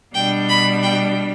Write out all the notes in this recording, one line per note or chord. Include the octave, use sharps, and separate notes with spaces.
B2 G3 D4 G5
B5
G5